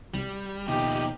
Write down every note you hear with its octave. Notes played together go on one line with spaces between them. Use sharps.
C2 G3
D#2 B2 D#3 F3 D#4 G4